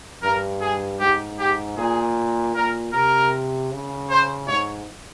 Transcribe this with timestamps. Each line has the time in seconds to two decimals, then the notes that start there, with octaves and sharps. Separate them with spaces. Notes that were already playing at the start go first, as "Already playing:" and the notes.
0.22 G2 A#4
0.61 G#4
1.00 G#2 G4
1.39 G4
1.77 A#2 G#4
2.55 A#2 A#4
2.93 C3 A#4
3.71 C#3
4.10 C5
4.48 G#2 C#5